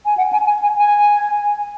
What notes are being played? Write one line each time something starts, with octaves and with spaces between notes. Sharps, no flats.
G#5
F#5
G#5
G#5
G#5
G#5